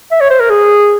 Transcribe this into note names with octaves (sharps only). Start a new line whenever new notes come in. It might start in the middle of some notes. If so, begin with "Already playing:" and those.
E5
C#5
C5
A#4
G#4